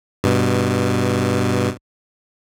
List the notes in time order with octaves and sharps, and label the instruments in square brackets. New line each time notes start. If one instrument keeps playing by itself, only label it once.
[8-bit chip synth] G2 B2